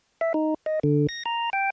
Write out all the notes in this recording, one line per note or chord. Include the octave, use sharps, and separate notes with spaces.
E5
D#4
D#5
D3
A#6
A#5
G5